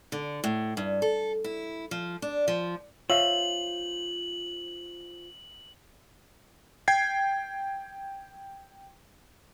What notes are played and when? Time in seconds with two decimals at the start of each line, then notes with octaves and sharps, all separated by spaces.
0.12 D3
0.44 A2
0.77 G2
1.02 A4
1.44 E4
1.91 F3
2.22 D4
2.48 F3
3.10 F4 C5 C#5 E5 F5 E6 F#7
6.88 G5 G#6 C7